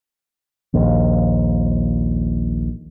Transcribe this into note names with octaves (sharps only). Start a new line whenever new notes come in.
A#1 D#2